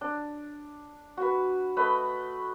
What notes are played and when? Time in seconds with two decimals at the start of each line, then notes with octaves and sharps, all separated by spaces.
0.01 D4
1.17 F#4 B4
1.77 A3 B4 D#5 B5